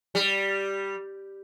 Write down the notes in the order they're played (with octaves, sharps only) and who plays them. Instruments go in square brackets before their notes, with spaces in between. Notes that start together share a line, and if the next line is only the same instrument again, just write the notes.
[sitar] G3